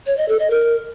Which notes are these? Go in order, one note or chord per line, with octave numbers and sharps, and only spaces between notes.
C#5
D#5
A4
D#5
A#4